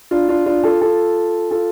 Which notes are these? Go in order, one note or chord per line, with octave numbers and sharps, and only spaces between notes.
D4 F4
D4 F4
D4 F4
F4 A4
F4 A4
F4 A4